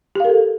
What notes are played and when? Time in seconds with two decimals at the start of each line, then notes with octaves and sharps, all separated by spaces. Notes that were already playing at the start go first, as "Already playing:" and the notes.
0.16 G4
0.20 F5
0.25 A#4
0.29 A4